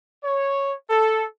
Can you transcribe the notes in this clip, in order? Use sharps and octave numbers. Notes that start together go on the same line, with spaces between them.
C#5
A4